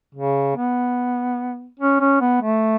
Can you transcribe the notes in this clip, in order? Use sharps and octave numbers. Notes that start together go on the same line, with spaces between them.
C#3
B3
C#4
C#4
B3
A3